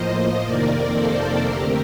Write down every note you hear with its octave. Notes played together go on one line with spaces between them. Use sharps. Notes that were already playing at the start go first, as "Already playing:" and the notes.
Already playing: A2 F3 A#3 C5 D#5
F2 C3 D#3 A#3 A#4 D5
A4 C5
F2 D3 A3 C4 G4 A#4